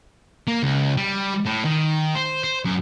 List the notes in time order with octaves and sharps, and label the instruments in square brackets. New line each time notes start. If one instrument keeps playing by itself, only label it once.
[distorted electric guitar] A#3
C#2
G3
A2
D#3
C5
C5
F#2